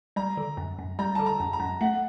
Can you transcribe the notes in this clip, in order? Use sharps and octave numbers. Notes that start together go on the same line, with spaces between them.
G3 A#5
D3
F#2
F#2
G3 A#5
D3 A5
A#5
F#2
A#5
F#2
A3 F#5